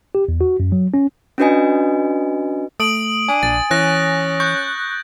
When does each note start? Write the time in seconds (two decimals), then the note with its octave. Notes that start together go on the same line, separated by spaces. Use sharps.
0.15 G4
0.28 E2
0.41 F#4
0.60 F#2
0.72 F#3
0.94 C#4
1.38 C#4 D4 F#4 B4 D#5 G#5
2.80 A3 D#6 D7 F#7
3.28 D4 G#5
3.43 A#1 A6
3.71 E3 C#4 F#6 A#6
4.40 C#6 F#6 G6